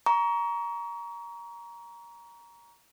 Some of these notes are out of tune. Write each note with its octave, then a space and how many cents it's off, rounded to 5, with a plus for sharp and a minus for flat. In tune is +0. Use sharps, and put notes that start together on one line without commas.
A#5 +15 C#6 +35